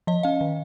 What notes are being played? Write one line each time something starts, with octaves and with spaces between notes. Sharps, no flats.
F3 D#5
C#4 F5
D#3